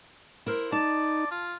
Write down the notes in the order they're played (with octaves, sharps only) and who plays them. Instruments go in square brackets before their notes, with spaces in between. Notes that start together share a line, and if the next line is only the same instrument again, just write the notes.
[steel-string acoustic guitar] E4 A#4 C5
[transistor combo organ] D#4 [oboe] D5 [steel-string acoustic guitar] A5
[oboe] F4